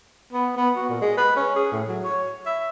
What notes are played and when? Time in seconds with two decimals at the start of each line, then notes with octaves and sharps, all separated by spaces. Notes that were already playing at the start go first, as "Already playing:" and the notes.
0.33 B3
0.57 B3
0.76 F#4
0.89 A#2
1.02 G#3
1.18 B4
1.36 C#4
1.56 G#4
1.72 A2
1.88 F#3
2.04 C#5
2.46 E5